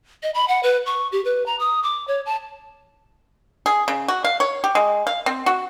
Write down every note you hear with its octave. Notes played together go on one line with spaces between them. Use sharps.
D#5
B5
F#5
B4
C#6
G4
B4
A#5
D#6
D6
C#5
A5
G#4
C#3
F#4
F5
C#5
G4
G#3
F5
C4
F#4